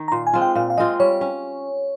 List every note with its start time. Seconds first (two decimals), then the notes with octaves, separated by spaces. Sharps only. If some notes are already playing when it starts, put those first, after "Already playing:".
Already playing: D#3
0.08 A#5
0.12 A#2 C6
0.27 G#5
0.33 G#3 C4 F4
0.42 G5
0.55 A#2 F5
0.70 F5
0.77 G#3 C4 F4 D#5
1.00 G3 C#5
1.21 C#4